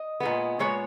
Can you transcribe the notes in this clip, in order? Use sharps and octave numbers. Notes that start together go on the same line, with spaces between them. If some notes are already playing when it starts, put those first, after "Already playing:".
Already playing: D#5
A#2 G#3 B3
A#2 G#3 B3 C#5